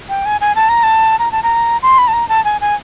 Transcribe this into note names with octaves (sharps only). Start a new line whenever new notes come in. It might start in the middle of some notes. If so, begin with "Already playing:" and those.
G5
G#5
G#5
A5
A#5
A5
A#5
A5
A#5
C6
B5
A5
A#5
A5
G#5
G#5